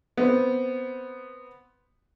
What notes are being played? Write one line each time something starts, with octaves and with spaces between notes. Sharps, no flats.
B3 C4